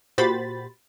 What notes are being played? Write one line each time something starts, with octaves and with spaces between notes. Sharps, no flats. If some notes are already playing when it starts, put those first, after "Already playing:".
A#2 F#4 G4 C5 B5 A6